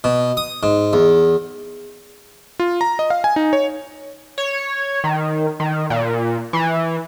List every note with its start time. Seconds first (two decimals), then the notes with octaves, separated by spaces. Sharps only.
0.04 B2
0.37 D#6
0.63 G#2
0.93 E2
2.59 F4
2.81 A#5
2.99 D#5
3.10 F5
3.24 G#5
3.36 D#4
3.53 C#5
4.38 C#5
5.04 D#3
5.60 D#3
5.90 A#2
6.53 E3